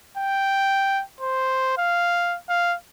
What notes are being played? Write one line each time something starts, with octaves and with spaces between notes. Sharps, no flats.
G5
C5
F5
F5